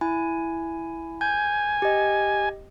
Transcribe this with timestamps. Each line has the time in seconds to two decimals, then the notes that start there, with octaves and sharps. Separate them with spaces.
0.01 E4 G#5
1.21 G#5 G6
1.82 G4 D#5